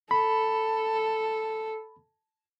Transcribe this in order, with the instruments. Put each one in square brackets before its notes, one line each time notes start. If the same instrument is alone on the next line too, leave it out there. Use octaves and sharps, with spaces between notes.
[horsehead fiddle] A4 [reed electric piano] B5